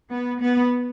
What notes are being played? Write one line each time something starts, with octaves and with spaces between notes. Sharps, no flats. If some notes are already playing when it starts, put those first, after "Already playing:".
B3
B3